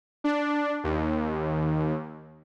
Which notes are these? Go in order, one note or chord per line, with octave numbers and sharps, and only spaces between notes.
D4
D#2